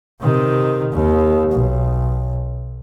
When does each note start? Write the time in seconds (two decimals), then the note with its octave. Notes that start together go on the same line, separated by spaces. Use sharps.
0.21 C3 D#3
0.92 D#2
1.52 B1